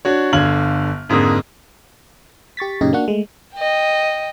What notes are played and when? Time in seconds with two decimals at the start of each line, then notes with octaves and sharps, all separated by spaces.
0.05 D4 F#4 C#5
0.33 G1 D3 F5 F6 G#6 F#7
1.09 F2 G#2 D3 A#3 D#6
2.57 G4 C#6 A6 B6
2.81 F#2 A#2 C#3 D#4 G4 D#5
2.93 A#3 D4 F#4 F#5
3.08 G#3 A3
3.55 D#5 G5